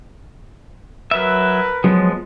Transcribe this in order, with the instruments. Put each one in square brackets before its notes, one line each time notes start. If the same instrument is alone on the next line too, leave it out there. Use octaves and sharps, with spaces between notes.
[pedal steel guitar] F#3 E5 [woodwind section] A#4 B4
[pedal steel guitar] F3 G#3 B3 [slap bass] F#3